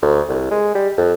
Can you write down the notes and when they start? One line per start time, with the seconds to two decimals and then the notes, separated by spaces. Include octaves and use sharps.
0.02 D2
0.29 C2
0.51 G#3
0.75 G3
0.97 F2